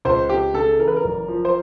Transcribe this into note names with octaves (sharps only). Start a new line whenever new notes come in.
C#2 C5
C#2 G4
C#3 A4
E3 A#4
B4
A#4
F#1
F3
C5